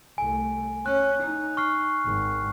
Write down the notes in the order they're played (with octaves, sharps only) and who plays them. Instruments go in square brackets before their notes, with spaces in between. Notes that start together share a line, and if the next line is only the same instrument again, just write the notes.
[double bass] C2 A3 [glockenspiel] G#5
[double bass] C#4 [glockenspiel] F#6
[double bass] D#4
[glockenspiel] C#6 F6 C7
[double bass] G#1